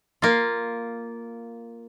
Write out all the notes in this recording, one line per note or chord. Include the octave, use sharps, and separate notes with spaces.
A#3 F4